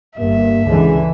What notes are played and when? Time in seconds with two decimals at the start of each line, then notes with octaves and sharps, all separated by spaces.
0.19 G1 G2 A#3 E5
0.66 C#2 D3 E3 G#3 C#4